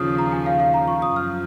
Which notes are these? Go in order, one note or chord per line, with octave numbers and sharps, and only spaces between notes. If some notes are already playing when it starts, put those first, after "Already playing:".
Already playing: D#2 C#3 F3 D#6 F6
A#5
G#5
F5
F5
A#5
C#6
D#6
F#2 F3 F6